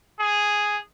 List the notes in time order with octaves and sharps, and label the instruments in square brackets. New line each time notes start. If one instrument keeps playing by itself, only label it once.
[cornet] G#4